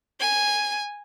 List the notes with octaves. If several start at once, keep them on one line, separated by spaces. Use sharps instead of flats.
G#5